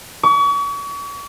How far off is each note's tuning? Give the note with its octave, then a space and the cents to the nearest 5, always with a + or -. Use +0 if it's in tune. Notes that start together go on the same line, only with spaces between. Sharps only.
C#6 +40